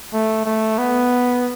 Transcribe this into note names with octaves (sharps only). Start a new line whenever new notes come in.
A3
A3
B3